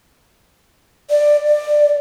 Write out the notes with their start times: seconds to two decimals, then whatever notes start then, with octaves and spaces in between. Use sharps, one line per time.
1.10 D5
1.46 D5